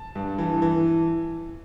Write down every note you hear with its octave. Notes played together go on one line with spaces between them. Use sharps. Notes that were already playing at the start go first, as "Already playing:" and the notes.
Already playing: A5
G2
E3
E3